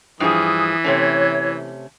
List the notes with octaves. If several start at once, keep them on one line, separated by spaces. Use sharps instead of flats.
G2 E3 F3 G#4 D#6
C3 A3 C#4 C#5